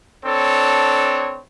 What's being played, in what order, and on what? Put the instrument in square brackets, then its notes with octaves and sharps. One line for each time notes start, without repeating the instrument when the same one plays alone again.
[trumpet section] C4 D4 A4 C#5